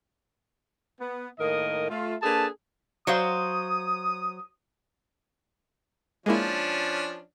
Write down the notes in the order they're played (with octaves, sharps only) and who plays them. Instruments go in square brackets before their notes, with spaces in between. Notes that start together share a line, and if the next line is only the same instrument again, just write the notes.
[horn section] B3
A2 D#3 A#3 A#4 D#5
A3 F4
A#3 D4 G#4 A4 B4 A5
[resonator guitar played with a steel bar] F#3 C5 F5 [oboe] D#6
[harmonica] F3 C#4 D4 [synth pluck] G#3 A#3 E4